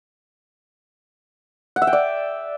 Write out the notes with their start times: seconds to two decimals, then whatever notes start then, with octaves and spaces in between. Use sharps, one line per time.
1.76 F#5
1.82 E5
1.87 G5
1.93 D5